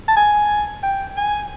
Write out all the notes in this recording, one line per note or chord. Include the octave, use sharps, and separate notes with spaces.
A5
G#5
G5
G#5